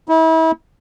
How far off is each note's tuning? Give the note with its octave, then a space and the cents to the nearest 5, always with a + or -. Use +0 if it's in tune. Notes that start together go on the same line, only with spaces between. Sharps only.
E4 -35